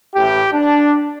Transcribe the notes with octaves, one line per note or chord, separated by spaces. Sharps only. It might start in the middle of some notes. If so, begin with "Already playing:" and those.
A1 A2 E3 G4
D4